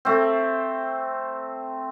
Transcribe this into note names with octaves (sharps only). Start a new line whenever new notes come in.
A3 C4